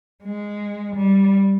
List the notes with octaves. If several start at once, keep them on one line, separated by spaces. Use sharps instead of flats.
G#3
G3